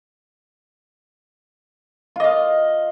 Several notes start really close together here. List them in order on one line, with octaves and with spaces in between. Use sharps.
F4 D#5 F5